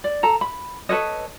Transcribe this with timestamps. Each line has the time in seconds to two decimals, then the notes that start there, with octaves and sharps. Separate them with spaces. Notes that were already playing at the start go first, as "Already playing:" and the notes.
0.04 D5
0.23 A4 A#5
0.41 B5
0.89 A4 B4 C#5 D#5